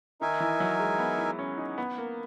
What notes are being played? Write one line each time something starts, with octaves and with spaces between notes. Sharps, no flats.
D#3 D#4 A#4 E5 G#5
E3
F#3
G#3
B3
E4
C#4
D#4
B3
A#3